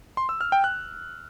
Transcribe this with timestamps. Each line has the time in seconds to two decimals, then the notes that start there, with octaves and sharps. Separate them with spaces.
0.17 C6
0.29 E6
0.41 F6
0.52 G5
0.64 F#6